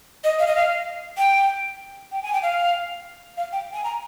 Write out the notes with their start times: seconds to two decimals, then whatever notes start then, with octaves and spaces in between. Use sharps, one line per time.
0.24 D#5
0.39 F5
0.47 D#5
0.55 F5
1.18 G5
2.12 G5
2.22 G#5
2.33 G5
2.42 F5
3.37 F5
3.52 G5
3.73 G#5
3.84 A#5